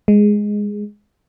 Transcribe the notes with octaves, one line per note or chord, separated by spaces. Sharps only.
G#3